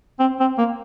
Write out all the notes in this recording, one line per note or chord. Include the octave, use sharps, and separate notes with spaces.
C4
C4
A#3